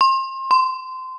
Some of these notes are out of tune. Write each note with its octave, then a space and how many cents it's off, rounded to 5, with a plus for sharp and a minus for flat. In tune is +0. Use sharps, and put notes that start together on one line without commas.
C6 +30
C6 -20